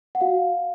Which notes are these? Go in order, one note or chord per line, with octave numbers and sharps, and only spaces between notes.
F#5
F#4 F5